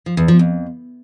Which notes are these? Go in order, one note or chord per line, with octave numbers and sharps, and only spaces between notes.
F3
E2
F3
F2